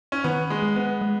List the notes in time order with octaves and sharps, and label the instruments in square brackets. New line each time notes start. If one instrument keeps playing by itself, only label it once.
[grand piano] C#4
[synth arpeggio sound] D#3 [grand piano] B3
[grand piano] G#3
[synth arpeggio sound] G#3
[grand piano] B3
[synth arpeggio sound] G#3